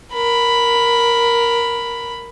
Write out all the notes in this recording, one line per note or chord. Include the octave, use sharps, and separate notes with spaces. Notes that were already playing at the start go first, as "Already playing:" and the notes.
A#4 B5